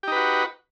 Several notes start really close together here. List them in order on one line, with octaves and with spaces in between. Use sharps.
G4 D#4 B4 F#4